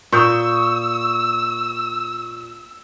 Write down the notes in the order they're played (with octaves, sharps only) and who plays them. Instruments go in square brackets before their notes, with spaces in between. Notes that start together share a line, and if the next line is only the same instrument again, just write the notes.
[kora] A#2 [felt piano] C#6 D#6 G6 [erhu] E6